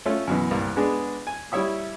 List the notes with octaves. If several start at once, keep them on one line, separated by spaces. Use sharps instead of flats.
A3 C#4 F4
F#2 B2 E3
C2 G2 A#3
G#3 B3 D4 G#4
G#5
G3 E4 C#5 E5 D#6